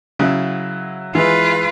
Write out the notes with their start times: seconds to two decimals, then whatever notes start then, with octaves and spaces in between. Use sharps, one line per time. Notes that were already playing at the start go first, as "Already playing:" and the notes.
0.19 C#3 F#3 E4
1.15 E3 G#3 E4 F4 B4